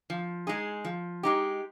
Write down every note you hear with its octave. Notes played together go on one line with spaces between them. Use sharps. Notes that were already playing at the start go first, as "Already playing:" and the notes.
F3
G#3 D#4 G#4
F3
G#3 D#4 G4